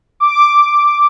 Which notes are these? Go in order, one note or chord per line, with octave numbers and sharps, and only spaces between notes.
D6